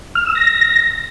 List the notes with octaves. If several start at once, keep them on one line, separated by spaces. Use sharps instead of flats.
F6
E6
A#6